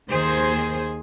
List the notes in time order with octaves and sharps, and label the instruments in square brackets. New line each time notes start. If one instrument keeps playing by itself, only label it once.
[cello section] D#2 D#3 G#4 C5